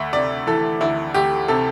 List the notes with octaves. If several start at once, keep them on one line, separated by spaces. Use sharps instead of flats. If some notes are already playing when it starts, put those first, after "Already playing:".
Already playing: D2 E5
C3 D5
E3 A4
D2 E4
D2 G4
C3 A4